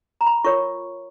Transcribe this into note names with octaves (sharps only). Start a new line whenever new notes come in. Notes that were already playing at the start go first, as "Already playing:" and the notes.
A#5
B5
F4 A#4 C#5 C#6